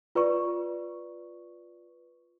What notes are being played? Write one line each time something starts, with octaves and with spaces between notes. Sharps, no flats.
F4 B4 D5 C#6